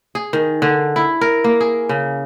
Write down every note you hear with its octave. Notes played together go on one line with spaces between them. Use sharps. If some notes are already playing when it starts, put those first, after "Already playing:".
G#4
D#3
D3
E4
A#4
A#3
G#4
C#3